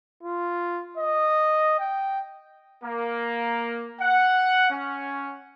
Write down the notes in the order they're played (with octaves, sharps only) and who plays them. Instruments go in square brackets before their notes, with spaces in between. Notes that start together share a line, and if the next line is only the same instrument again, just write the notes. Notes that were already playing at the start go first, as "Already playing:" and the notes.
[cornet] F4
D#5
G5
[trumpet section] A#3
F#5
C#4